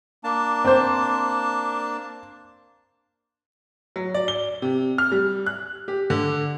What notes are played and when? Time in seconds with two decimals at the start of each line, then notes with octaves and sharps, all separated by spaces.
0.24 A#3 D4 A5
0.65 C4 C5
3.96 F#3
4.14 D5
4.28 G7
4.62 C3
4.98 F6
5.12 G3
5.46 F#6
5.88 G4
6.10 D3